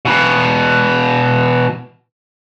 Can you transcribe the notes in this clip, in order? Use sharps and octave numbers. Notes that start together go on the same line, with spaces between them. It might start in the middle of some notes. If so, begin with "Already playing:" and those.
B2 E3